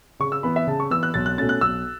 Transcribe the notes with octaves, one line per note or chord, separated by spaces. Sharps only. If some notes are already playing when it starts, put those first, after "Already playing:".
C#3 C#6
E6
E3 B3 B5
E5
C#3 A5
C#6
E3 B3 E6
F#6
B1 A6
F#6
B2 A3 C#4 A6
F#6
B1 E6